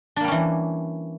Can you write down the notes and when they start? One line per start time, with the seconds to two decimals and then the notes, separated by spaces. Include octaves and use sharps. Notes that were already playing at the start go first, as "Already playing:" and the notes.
0.16 D4
0.20 A#3
0.24 G3
0.28 C#4
0.32 E3